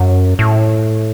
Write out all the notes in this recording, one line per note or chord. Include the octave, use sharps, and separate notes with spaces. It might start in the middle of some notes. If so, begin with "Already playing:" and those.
Already playing: F#2
A2